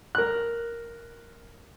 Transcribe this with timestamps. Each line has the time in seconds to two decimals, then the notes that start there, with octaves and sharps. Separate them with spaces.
0.15 A#4 F#6